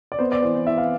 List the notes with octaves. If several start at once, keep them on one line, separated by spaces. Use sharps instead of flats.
D5
B3 C5
D5
E3 C5
C5
E3 E5
F5